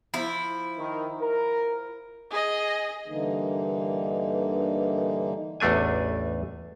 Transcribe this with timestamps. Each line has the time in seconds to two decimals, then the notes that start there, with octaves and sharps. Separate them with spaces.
0.14 F3 E4
0.78 D#3
1.21 A#4
2.31 G#4 D#5
3.08 G2 D3 E3 A#3 D#4
5.60 A1 E2 A3 D4 G#5